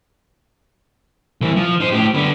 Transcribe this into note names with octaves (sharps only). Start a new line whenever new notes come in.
C2 E3
F3
D#4 C5
A2 G4
D3 B3